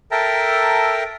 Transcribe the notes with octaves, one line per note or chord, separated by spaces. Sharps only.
A4 A#4 E5 G5 A5 A#5